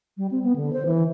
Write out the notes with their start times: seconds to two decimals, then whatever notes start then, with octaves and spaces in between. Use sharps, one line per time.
0.17 G3
0.31 C4
0.43 B3
0.56 D3
0.73 C5
0.86 E3